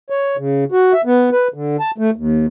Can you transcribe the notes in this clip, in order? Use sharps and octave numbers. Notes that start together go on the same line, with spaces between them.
C#5
C#3
F#4
E5
B3
B4
D3
A5
A3
D#2